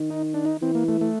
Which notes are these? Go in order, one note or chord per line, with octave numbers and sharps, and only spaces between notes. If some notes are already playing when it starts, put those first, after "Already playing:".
Already playing: D#3
D#4
D4
D#4
E3 C4
A#3
A3
A3